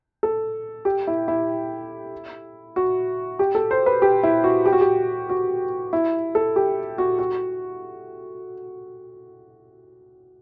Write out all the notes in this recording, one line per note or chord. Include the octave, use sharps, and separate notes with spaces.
A4
G4
E4
E4
F#4
G4
A4
C5
B4
G4
E4
F#4
G4
F#4
G4
F#4
E4
A4
G4
F#4
F#4